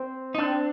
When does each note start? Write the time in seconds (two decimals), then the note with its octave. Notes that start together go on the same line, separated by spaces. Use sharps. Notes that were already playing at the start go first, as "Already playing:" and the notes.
Already playing: C4
0.35 D#4
0.38 C4 D4